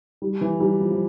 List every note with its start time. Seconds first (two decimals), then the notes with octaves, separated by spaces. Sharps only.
0.22 G3
0.41 E3
0.60 F#3 G3
0.81 F3
0.91 F3